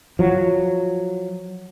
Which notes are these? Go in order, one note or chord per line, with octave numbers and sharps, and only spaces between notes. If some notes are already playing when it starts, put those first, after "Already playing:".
F3 F#3